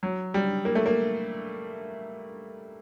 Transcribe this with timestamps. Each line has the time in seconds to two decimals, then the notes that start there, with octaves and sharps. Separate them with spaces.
0.03 F#3
0.34 G3
0.65 A#3
0.75 A3
0.86 A#3